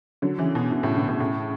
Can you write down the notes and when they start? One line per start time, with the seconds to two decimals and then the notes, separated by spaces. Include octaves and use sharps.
0.22 D3 F#3
0.38 C#3 E3
0.55 B2
0.72 B2
0.83 A2 C#3
0.95 B2 D3
1.08 A2 C#3
1.20 A2 C#3